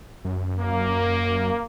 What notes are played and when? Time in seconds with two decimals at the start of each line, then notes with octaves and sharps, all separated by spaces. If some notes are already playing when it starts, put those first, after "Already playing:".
0.25 F#2
0.60 A#3